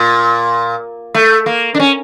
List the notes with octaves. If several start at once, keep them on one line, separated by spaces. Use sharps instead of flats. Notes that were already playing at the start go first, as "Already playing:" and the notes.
Already playing: A#2
A3
A#3
D4
C#4